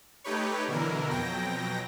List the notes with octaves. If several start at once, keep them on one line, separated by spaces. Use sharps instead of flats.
A3 D#4 G4 B4 C#5
B2 D3 E3 F#3 E4 A#4
F2 B2 F#3 G5 A#6